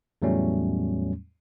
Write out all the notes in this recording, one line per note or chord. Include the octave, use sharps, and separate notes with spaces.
E2 A2 F#3 G3 A3 C#4